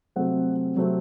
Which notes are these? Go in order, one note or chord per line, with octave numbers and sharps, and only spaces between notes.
C3 F#3 A3 C4 F#5
C3 F#3 A3 C4